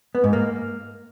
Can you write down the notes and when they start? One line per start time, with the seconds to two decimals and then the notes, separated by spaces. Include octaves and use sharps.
0.15 B3
0.24 G#2
0.33 A#3